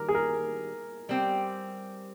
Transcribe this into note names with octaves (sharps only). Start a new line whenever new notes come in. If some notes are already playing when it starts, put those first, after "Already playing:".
Already playing: D#3 G3 A#4
G#4
A#4
G3 C4 G4